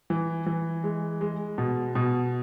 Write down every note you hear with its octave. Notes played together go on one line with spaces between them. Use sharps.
E3
E3
G#3
G#3
B2
B2